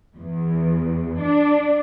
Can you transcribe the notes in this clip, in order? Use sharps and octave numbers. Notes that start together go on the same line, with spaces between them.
E2
D4